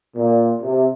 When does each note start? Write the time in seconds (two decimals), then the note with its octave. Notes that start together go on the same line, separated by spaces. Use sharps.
0.16 A#2
0.61 C3